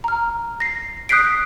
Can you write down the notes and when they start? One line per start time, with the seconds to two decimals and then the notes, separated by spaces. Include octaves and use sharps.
0.04 A#5 F6
0.60 A#6 C7
1.09 D#6 F#6 G6 B6 C7 D7